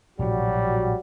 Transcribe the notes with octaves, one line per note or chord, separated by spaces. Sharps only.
A#1 A2 C3 F#3 G3 F#4